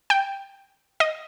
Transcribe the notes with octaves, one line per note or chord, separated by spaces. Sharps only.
G5
D#5